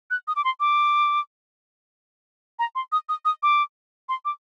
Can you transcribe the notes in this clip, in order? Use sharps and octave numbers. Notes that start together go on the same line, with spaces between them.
F#6
D#6
D6
C6
D6
A#5
C6
D#6
D#6
D#6
D6
C6
D6